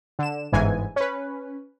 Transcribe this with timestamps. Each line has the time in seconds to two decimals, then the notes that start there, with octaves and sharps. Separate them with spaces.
0.19 D3 E7
0.53 G1 G#2 E3 G#5
0.96 C#4 B4